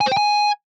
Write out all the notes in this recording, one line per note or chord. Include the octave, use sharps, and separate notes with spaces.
G#5
C5
G5
G#5